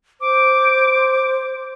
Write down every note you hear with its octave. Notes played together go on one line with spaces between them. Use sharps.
C5 D6